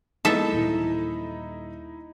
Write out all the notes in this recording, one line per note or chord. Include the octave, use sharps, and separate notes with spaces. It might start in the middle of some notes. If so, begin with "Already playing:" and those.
G#3 A#3 B3 D#4 E4 A4 D#5 E5
D#1 E3